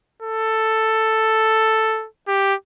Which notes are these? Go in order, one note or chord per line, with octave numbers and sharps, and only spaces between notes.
A4
G4